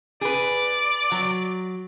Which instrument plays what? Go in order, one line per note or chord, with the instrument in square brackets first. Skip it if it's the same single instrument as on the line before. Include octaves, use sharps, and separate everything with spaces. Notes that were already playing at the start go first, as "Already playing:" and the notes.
[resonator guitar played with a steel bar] G#4 B4 [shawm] D5
[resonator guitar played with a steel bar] F#3